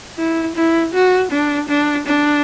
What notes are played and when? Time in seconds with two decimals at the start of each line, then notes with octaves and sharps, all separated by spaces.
0.18 E4
0.56 E4
0.94 F#4
1.32 D4
1.70 D4
2.07 D4